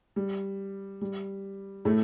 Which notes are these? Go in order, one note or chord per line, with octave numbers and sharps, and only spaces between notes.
G3
G3
A2 A3